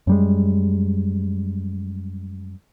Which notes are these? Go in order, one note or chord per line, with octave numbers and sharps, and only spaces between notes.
F#2 G3 G#3